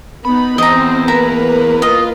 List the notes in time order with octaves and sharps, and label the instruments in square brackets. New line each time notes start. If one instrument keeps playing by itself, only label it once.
[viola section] B3 D#4 [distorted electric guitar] B5
[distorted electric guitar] E2 [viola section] C4 C5 [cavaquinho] D#5 A#5
[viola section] A#3 A#4 B4 [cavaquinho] E4 A#5
[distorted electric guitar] F4 [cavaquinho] D#5